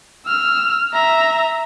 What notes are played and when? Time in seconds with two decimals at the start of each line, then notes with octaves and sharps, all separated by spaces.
0.26 E6 F6
0.94 E5 A#5